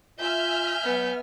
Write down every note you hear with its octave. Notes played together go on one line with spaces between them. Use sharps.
F4 E5 G#5 F6 G6
F#3 B3